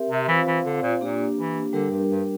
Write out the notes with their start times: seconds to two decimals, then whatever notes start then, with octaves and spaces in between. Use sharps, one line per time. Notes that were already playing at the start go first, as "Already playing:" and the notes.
Already playing: C4 G4 A#4 E5
0.10 C3
0.28 E3 C4 F4 C5 F5
0.47 E3
0.65 D3
0.82 A#2
1.01 A#2 A#3 D4 G4
1.38 E3
1.73 D3 G3 D4 G4 A#4
1.91 G2
2.10 G2